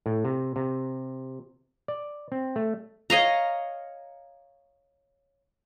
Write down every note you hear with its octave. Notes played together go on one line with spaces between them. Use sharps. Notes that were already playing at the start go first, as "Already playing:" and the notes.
A2
C3
C3
D5
C4
A3
C#5 D#5 F5 A#5